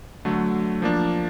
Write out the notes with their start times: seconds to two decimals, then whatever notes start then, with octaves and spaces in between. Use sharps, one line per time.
0.25 D3 F#3 A3
0.82 F3 A#3 D4